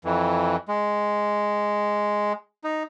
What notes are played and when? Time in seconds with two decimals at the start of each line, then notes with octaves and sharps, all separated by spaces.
0.05 F2 E3
0.68 G#3
2.64 D#4